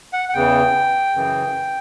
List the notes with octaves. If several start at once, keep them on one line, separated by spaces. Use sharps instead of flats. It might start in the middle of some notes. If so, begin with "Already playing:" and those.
F#5
F#5
E2 C#3 E3 G5
F#2 C#3 E3